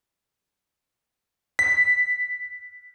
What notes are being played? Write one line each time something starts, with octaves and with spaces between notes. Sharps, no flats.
B6